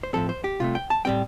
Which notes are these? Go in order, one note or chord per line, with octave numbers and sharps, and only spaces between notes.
C5
A2 F3 C4 A4
C5
G4
C2 C3 A3 F4
G5
A5
A2 G3 C4 G5